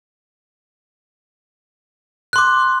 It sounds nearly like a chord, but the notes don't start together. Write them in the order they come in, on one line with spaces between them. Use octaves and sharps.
F#6 C6 D6